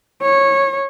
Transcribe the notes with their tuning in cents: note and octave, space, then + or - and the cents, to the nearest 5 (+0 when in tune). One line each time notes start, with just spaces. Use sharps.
C#5 -15